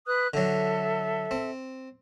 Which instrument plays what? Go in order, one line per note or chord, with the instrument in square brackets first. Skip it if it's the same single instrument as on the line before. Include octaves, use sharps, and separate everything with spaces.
[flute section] B4 D#6 F#6
[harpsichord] D3 F#3 [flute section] A4 E5
[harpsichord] C4